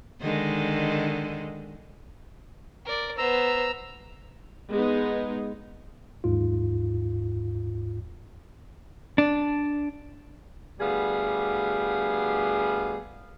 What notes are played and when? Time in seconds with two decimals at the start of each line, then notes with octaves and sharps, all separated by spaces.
0.21 D3 D#3 G#3
2.86 A#4 D5
3.18 B3 C5 A#5 E6
4.71 G#3 B3 D#4
6.24 D#2 G#2 F4
9.18 D4
10.80 D2 G3 B3 G#4 F5